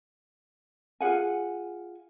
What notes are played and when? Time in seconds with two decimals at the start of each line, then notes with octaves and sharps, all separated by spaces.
1.00 F4 G#4 F#5 G#5